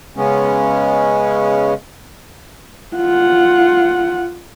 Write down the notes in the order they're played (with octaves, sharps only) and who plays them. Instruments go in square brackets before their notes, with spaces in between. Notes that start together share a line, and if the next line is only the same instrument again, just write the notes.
[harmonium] C#3 G#3 B3 C#4
[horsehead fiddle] F4 F#5